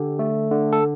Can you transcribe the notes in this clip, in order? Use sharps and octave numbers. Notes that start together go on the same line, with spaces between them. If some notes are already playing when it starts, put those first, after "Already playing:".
Already playing: D3 G4
A3
D3
A4